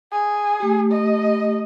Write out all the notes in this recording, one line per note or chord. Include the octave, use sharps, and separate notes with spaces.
G#4
A3 G4
D#5